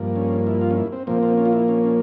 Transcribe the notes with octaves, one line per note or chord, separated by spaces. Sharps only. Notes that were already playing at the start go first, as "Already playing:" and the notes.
Already playing: G2 F3 A#3
C#4
E4
F4
C#4
E4
C4
A#2 F3 A#3 C4
C4
C#4
F4
E4
C#4
C#4